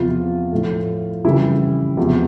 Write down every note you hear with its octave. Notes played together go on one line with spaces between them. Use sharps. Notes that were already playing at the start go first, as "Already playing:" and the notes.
Already playing: E2 C3 F3 F4
A2 F3 A3
F2 C#3 E3 G3 E4
E2 C3 F3 G#3